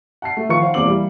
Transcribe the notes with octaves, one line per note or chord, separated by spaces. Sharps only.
F#5 A5 C7
A3
D#3 F3 F4 B4 C#6 C#7
C5 F5 F#5
E1 E2 A#3 C4 D6 F#7
E3 G3 A#3